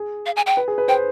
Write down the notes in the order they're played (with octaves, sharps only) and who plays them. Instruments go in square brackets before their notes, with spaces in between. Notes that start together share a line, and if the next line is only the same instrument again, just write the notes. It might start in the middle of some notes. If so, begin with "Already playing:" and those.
Already playing: [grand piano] G#4
[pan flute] F5
G#5
G5
[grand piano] B4
G#4
B4
[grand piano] C5 [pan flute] G5